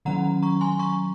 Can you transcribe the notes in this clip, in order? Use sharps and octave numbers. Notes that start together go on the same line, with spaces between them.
D#3 F#3 C#4 F#5 A#5
A#5 C#6
G#5 C6
A#5 C#6